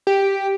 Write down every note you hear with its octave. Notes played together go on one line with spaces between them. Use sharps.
G4